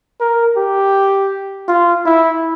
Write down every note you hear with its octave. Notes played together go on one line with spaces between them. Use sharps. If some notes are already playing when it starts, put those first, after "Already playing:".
A#4
G4
F4
E4